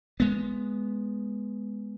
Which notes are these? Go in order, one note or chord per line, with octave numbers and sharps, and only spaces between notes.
G#3 B3